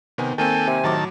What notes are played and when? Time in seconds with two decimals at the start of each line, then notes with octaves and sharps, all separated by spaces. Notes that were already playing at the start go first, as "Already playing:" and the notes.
0.18 C3 D#3 B3 G#5
0.38 D#3 A#3 C4 A4 G5 G#5
0.67 C3
0.84 A2 D#3 F#3 A5 D6